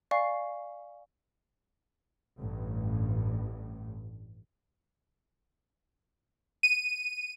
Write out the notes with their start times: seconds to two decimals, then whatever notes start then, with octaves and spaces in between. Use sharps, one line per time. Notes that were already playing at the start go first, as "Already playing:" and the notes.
0.11 D5 F5 G#5 C#6 C7
2.37 A1 G2
6.63 D#7